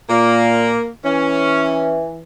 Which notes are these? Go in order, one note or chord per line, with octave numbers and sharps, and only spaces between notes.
A#2 A#3
E3 C#4